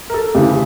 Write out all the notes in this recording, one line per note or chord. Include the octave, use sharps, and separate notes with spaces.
A#4
A4
D2 C#3 E3 G4